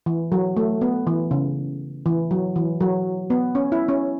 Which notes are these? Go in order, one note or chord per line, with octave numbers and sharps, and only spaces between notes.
E3
F#3
A3
B3
E3
C#3
E3
F#3
E3
F#3
B3
C#4
E4
C#4